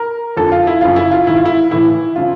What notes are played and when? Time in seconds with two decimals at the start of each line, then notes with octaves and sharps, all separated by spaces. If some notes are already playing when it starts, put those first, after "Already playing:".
Already playing: A#4
0.37 F2 D3 F3 A4
0.52 F4
0.67 E4
0.81 F#2 C#3 F3 F4
0.96 E4
1.11 F4
1.27 G#2 D#3 E4
1.35 F4
1.45 E4
1.71 A2 E3 E4
2.16 C#3 F3 F4